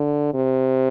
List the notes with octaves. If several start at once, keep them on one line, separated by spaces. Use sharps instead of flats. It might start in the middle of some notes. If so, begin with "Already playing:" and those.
Already playing: D3
C3